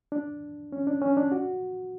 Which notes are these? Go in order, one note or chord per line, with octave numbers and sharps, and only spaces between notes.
D4
C#4
D4
C#4
D4
F#4